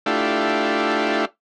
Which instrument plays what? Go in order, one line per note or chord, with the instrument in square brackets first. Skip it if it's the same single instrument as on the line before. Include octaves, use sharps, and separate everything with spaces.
[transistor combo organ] A3 D4 E4 F4 G4